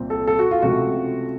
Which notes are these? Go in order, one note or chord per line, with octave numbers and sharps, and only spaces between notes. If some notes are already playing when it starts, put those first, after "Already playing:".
Already playing: C2 A#2 C4
A4
A4
F#4
F4
C#2 C3 F3 A3 F#4